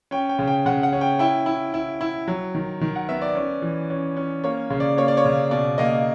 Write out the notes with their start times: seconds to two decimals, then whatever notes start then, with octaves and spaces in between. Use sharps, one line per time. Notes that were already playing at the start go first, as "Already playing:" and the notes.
0.11 C#4 G5
0.29 G5
0.39 C#3
0.48 G5
0.66 C#3 F#5
0.83 F#5
0.93 C#4
1.01 G5
1.19 E4 G5
1.46 E4
1.74 E4
2.01 E4
2.28 F#3
2.55 D#3
2.81 D#3
2.96 F#5
3.09 B3 E5
3.22 D5
3.35 C#4
3.62 E3
3.90 C#4
4.17 C#4
4.44 A#3 C#5
4.70 C#3
4.80 D5
4.97 A#3 C#5
5.08 D5
5.17 C#5
5.25 C#3
5.51 B2 D5
5.78 A#3 D#5